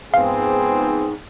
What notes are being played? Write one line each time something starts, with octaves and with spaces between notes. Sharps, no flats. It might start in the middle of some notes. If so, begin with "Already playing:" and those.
G#2 F3 B3 C4 G#4 F5